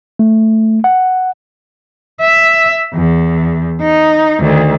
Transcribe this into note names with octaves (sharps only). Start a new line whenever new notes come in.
A3
F#5
E5
E2
D#4
D2 D#3